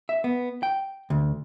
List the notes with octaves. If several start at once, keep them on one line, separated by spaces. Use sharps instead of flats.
E5
B3
G5
D2